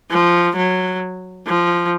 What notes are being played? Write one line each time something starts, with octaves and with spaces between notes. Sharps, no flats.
F3
F#3
F3